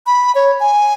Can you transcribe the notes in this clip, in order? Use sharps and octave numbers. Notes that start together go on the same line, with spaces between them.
B5
C#5
G#5